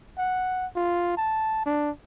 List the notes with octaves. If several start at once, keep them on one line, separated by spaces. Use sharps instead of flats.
F#5
F4
A5
D4